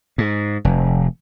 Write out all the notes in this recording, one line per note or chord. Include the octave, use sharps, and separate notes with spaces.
G#2
F1